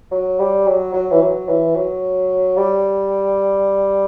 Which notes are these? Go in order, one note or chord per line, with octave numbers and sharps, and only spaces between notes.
F#3
G3
F#3
F#3
E3
F#3
E3
F#3
G3